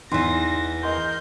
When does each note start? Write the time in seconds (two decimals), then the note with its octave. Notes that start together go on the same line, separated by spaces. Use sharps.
0.11 E2 E3 D#4 C6 A#6
0.83 A#4 D#5 C6 G6